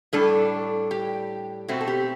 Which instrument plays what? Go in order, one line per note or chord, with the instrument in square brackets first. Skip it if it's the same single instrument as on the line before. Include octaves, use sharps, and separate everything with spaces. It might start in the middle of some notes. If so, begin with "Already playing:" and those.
[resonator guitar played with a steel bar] A2 G3 D4 A4
G4
B2 A3 C4 F#4
A4
G4